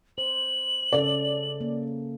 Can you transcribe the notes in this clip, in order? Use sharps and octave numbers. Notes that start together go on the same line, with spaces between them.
C5 F#7
C#3 C#4 A4 D5
A#3